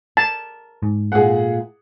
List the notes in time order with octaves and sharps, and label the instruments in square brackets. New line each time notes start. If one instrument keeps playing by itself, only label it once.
[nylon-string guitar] A#4 [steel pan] A5
[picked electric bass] G#2
[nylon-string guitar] A#2 A3 [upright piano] G#4 F#5